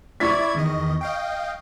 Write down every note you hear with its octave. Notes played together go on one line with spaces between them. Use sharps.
E4 D5 C#6 G#6 B6
E2 D#3 D#5
D#5 F5 G5